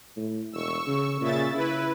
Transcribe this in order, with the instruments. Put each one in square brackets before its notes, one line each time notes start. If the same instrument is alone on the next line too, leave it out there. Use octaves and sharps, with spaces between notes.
[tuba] A2
[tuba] E1 [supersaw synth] C#6 E6
[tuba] C#3
[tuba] A#2 [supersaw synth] C#3 E5 A6
[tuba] C#3 [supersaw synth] E4 B4